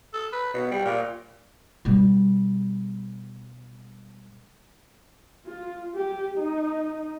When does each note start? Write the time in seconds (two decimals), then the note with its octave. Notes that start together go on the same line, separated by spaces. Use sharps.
0.14 A4
0.33 B4
0.54 B2
0.71 G3
0.85 A#2
1.85 B2 G3
5.46 F4
5.95 G4
6.38 D#4